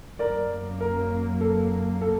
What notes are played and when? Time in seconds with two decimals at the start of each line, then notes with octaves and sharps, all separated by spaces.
0.19 F#2 F#3 A#3 A#4 D5
0.80 A#4
1.41 A4
2.01 A4